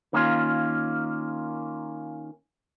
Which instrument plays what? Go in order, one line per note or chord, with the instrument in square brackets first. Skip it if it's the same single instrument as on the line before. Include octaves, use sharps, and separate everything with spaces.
[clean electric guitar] D#3 A#3 C#4 F4